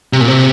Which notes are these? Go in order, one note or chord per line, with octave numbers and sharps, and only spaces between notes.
C3
A#2
C3